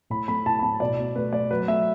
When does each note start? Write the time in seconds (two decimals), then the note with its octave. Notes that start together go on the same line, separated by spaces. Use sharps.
0.10 A2 B5
0.28 A3 B5
0.46 A2 A5
0.59 B5
0.63 A3 A5
0.80 B2 D5
0.98 B2
1.16 A3 B4
1.33 A3 D5
1.51 F#3 B4
1.68 A3 E5